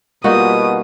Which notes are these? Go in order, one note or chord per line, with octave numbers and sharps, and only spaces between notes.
B2 G3 A#3 D#4 F4 F#4 D#6